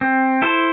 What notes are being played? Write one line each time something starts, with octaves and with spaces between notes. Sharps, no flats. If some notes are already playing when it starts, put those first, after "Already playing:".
C4
E4 A4 C5